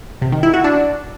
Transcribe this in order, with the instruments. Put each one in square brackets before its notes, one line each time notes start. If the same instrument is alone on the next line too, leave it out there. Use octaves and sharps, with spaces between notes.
[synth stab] C3
D#3
E4
F#4
D4